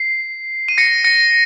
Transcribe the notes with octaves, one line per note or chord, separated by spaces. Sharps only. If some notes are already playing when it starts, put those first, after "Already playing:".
Already playing: C7
D#7
A#6 C#7
A#6 C#7